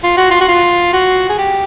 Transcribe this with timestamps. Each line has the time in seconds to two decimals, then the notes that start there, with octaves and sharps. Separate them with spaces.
0.03 F4
0.17 F#4
0.31 F4
0.41 F#4
0.48 F4
0.93 F#4
1.29 G#4
1.38 G4